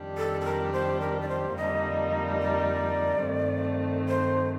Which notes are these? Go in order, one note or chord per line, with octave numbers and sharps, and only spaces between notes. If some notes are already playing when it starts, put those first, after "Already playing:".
Already playing: F2 D#3 G3 D4 G4
A4
A4
A#4
C5
A#4
D5
C5
F2 D3 G3 A#3 D#4 D#5
D5
G2 D#3 A3 C4
C5